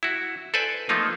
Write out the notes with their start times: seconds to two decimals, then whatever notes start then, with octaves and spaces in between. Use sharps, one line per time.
0.03 E4 F#4
0.54 A4 B4 C5 D5 G#5
0.89 F3 A3 A#3 D#4 F4